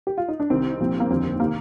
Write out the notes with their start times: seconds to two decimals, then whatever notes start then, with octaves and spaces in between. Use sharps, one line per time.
0.07 G4
0.18 F4
0.28 D#4
0.40 D4
0.50 C2 C3 D#3 C4
0.79 C2 A#2 F3
1.00 A#3
1.09 F1 D#2 D3 F3 C4
1.40 C3 D#3 A#3